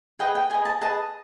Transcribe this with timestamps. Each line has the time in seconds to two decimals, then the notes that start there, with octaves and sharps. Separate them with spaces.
0.19 G#4 B4 D#5 G5
0.35 G5
0.50 G#4 B4 D#5 G#5
0.65 A5
0.81 G#4 B4 D#5 A5